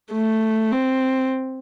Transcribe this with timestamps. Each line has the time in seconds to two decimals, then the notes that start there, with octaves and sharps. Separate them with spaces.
0.13 A3
0.71 C4